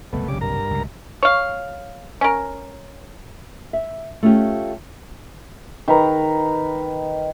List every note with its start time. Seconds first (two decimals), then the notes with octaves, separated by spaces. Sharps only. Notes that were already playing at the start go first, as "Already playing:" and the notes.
0.13 F#1 C2 B2 A3 B3
0.28 C#3 G3 D6
0.41 G2 A#4 A#5
0.71 C#2 C3
1.23 C#5 F5
2.21 C#4 A#4
3.73 E5
4.23 A3 C#4 F4 G4
5.88 D#3 B4 A#5